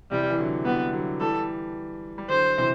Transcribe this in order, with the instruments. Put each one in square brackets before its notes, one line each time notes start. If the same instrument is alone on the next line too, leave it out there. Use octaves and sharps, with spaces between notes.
[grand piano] C3 E3 [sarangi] G3
[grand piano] E3
D3 F#3
[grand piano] E3 G3 [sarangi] B3
[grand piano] D3 F#3
[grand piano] E3 G3 [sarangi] A4
[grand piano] G3
[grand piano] D3 F#3 [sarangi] C5
[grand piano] C3 E3